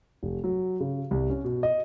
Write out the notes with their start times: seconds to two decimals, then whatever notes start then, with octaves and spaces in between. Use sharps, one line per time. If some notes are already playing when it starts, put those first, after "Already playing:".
0.23 F1
0.44 F#3
0.80 C#3
1.11 C2
1.30 C#4
1.44 B2
1.63 D#5